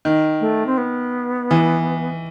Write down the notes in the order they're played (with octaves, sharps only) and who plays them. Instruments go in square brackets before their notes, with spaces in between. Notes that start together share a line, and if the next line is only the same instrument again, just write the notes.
[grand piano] D#3
[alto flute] A3
C4
B3
[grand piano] E3